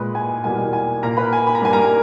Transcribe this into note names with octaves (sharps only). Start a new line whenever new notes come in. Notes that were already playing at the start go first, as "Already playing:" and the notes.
Already playing: A#2 G#3 B4 B5
G#5
E2 B2 G3 A#3 G#5
G#5
A#2 A#3 A#4 A#5
B4 B5
G#5
B5
A#5
G2 G3 A#3 G#5
A#4 A#5